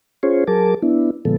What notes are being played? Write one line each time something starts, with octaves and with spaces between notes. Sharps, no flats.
C#4 F4 G#4 C5 C#5
F#3 G#4 A#4 A5 D6
B3 D4 E4
A#2 D3 F3 G#3 B3 A4